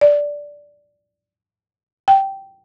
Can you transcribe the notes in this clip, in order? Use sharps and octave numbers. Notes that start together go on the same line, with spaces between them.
D5
G5